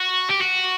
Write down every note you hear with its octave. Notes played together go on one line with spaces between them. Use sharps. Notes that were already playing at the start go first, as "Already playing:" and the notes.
Already playing: F#4
G4
F#4